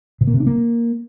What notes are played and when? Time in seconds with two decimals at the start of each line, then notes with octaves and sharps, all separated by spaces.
0.21 B2
0.27 A#3
0.34 C3
0.40 D4
0.47 A#3